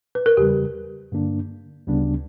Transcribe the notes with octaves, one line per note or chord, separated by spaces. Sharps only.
B4
A#4
E2 C#3 G3 G4
G2 D3 A#3 D4
D2 C#3 G3 B3 D4